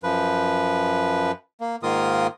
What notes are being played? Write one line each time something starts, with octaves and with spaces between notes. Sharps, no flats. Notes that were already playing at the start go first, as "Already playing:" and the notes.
F#2 F3 B4
A#3
G#2 D#3 A#3 F4 A#4 D#6